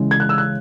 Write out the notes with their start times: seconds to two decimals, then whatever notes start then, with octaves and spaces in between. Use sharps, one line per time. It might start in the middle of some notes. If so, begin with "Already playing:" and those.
Already playing: C#3 E3 G#3
0.11 G#6
0.20 F#6
0.29 E6
0.38 F#6